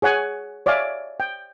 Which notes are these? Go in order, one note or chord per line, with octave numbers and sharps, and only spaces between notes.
G#4 C#5 F#5 G#5
C#5 D5 E5 F5 G#5
G5